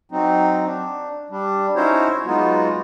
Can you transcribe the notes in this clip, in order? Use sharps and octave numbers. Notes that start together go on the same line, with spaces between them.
F#3 C4 D#4
D4
G3 D4
C#4 D#4 E4 F#4 C5 C#5
F#3 G#3 B3 D#4 F4 F#4